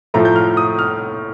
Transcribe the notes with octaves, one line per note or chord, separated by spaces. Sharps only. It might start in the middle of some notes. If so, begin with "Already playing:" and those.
A2 F3 A3 A#5
G6
F6
D#6
F6